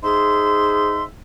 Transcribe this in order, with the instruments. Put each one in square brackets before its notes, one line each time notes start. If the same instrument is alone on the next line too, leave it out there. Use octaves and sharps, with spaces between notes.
[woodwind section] D#4 G#4 C5 E5 C6